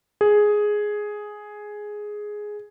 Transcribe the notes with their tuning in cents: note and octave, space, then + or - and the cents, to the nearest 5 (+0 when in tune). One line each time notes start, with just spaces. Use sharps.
G#4 +5